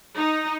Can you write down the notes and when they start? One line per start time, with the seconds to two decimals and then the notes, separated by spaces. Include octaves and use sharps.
0.17 D#4